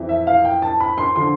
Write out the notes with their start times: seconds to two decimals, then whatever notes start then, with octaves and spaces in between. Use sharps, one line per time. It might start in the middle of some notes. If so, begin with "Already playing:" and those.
Already playing: F2 E3
0.09 E5
0.27 F5
0.45 G5
0.62 A5
0.80 B5
0.98 C6
1.16 D3 F3 C6